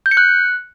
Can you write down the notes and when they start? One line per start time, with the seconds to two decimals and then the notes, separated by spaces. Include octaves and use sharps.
0.06 G6
0.11 C#7
0.17 F#6